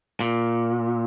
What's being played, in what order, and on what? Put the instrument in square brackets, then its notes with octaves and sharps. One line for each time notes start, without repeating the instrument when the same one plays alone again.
[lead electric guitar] A#2